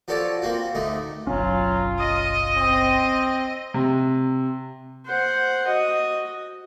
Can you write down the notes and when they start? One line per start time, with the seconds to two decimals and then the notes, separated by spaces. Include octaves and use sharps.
0.08 F3 F#4 A4 C#5 D5
0.42 A#3 C4 F#4
0.75 D2 A3 D#4
1.27 F#1 B1 F#3 C#4 F4
2.00 D#5 D#6
2.57 C4
3.74 C3
5.06 C5 F#5
5.67 F#4 D#5